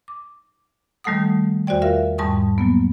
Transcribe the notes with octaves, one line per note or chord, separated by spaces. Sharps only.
D6
D#3 G3 A3 A4 F#5 D#6
E2 F#4 C5 D5 G5
F4 A#4 E5 F5
E2 G#2 G3 A5 C#6 D#6
F#3 A#3 B3